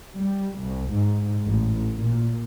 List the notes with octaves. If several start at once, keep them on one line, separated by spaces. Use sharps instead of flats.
G3
C2
G#2
A1
A#2